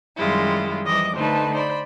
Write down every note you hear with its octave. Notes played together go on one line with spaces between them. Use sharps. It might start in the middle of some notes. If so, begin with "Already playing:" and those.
F#2 D#3 G3 G#3 E4 F4
E3 F3 G3 D#5 D6
D3 A3 D#4 B4 C5 A5
C5 D5 B5